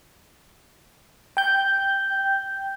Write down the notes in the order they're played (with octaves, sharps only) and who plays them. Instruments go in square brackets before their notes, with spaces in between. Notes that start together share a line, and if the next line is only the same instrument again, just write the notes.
[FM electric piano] G5 G6